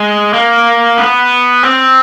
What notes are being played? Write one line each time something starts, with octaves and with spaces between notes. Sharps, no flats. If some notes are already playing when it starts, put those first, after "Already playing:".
Already playing: G#3
A#3
B3
C4